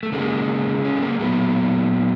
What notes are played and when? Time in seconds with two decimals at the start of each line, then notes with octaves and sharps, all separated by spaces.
0.03 A3
0.12 C#3 E3 G#3 A#3
0.84 C#4
0.97 A3
1.02 A#3
1.19 A#2 F#3 A3 B3